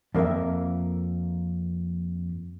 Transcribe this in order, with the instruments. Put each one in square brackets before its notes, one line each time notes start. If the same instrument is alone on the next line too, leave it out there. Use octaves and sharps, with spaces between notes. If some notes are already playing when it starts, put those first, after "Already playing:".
[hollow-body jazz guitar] F2 A#3 A#4 E5